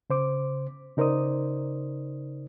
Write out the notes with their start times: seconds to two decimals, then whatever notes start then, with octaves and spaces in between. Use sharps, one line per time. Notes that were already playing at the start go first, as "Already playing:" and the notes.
0.10 C#3 C5 D6
0.97 C#3 D#4 A#4 C5 D5 D#6